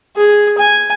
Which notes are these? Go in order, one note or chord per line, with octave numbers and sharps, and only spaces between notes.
G#4
G#5